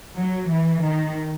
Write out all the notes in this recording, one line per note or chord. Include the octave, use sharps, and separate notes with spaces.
F#3
E3
D#3